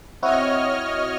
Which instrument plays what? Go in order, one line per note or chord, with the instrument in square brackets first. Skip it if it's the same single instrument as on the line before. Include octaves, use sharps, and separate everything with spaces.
[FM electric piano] C4 E4 F#4 [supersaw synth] C#5 D#5 F6